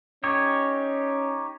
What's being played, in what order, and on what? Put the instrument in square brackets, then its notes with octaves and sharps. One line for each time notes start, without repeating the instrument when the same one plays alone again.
[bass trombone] C#4 [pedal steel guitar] D#4 G4 C#5